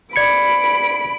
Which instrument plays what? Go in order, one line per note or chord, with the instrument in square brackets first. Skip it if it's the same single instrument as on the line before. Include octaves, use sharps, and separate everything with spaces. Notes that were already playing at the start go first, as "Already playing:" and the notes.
[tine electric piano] D5 G#6 C#7 [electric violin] B5 D7